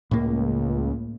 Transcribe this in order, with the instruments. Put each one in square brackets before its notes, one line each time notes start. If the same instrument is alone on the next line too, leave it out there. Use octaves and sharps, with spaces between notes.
[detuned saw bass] C#2 [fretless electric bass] A2 A#3